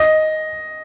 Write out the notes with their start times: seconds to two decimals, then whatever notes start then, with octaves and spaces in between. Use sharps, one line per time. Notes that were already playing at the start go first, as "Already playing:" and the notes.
Already playing: D#5